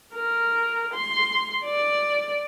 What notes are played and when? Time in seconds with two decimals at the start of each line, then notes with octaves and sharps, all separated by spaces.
0.15 A#4
0.94 C6
1.64 D5